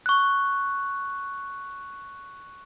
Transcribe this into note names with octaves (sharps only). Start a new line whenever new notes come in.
C#6 F#6